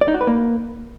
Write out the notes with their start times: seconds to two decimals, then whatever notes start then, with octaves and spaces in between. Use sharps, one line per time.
0.01 D5
0.08 D#4
0.14 F#4
0.21 B4
0.27 A#3